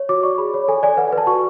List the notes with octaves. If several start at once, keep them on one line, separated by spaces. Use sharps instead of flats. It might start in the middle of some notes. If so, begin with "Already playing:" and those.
Already playing: C#5
F#4 D6
D5 C#6
G#4 B5
C#5
A4 G#5
D5 G#5
B4 F#5
G#5
B4
A5
F#4 C#6